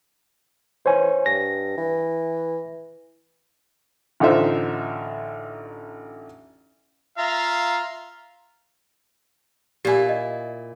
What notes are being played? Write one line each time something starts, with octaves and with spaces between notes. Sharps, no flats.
E3 C5 C#5 G#5
G2 A#6
E3
A1 D3 D#4 F4 C5 E5
F4 E5 F5 A#5
A#2 E4 G4 G#5
D#5